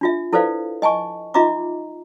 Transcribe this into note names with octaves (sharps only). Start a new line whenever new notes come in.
D4 F4 E5
E4 A4 B4 C5 D5 F5
D#5 G#5 A5 C#6
D#4 F4 D#5 E5 A#5 D6